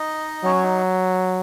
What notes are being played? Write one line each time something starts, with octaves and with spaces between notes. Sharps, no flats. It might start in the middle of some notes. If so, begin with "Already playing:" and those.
Already playing: D#4 D#5
F#3 C#4 C#5
D#4